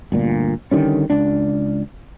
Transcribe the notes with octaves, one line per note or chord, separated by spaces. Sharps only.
G1 D2 A#2
D3 D#3 G3 C#4
C#2 D4